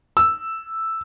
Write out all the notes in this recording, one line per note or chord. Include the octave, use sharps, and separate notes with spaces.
E6